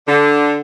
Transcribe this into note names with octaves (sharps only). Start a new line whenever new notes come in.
D3